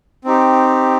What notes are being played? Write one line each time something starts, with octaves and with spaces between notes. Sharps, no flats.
C4 D#4 G4